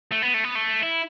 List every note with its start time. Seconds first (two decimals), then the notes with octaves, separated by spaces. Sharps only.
0.11 A3
0.22 B3
0.34 A3
0.44 B3
0.55 A3
0.83 E4